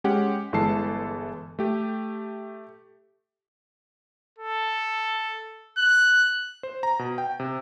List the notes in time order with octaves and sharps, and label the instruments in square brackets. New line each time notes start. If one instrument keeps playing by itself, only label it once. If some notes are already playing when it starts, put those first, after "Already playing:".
[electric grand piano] G#3 C#4 G4 F#5
G1 E3 G#3 A4 A5 C7
A3 G4
[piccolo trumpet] A4
F#6
[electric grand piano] C5
A#5
B2
G5
C3